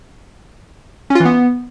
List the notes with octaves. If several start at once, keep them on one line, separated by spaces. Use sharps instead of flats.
C#4
F4
E3
B3